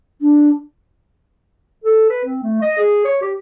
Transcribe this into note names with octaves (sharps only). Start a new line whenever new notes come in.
D4
A4
B4
C4
A3
D#5
G#4
C#5
G4